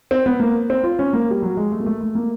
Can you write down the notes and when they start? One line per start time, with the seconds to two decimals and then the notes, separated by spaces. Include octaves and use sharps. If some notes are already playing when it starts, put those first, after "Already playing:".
0.11 C4
0.26 B3
0.40 A#3
0.70 C4
0.83 F4
0.99 C#4
1.13 A#3
1.31 G3
1.42 F#3
1.57 G#3
1.72 A3
1.80 A#3
1.86 A3
2.01 A3
2.15 A#3